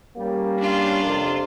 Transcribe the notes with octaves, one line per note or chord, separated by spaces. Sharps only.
G3 A#3 C#4
D4 F4
F2 C3